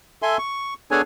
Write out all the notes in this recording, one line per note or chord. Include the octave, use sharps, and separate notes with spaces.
A4 E5 G#5 C6
C#6
B3 D4 G#4 A4 C#5 G#5